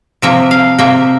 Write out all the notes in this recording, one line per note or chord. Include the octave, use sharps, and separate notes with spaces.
C3 F3 A#3 E5
F5
C3 F3 A#3 E5